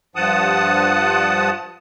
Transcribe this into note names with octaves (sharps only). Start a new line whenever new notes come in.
G2 F3 F#5 A5 D#6